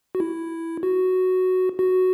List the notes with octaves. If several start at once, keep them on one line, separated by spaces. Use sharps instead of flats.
F#4
E4
F#4
F#4